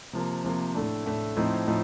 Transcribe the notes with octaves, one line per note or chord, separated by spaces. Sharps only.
C3 F3 A#3
C3 F3 A#3
A2 A3 D4
A2 A3 D4
A2 F3 C4 D#4
A2 F3 D#4